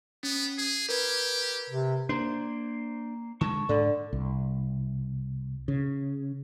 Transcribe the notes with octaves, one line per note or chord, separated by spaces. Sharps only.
B3 C#4
G#4
G4 A#4 B4 G#6
C3
A#3 D4 C5
D3 G#3 A5 C#6
G#2 D3
C2
C#3